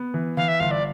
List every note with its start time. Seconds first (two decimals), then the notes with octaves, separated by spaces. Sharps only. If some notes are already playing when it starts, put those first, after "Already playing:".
Already playing: B3
0.14 E3
0.37 E3 F5
0.48 E5
0.60 G1 F5
0.71 D5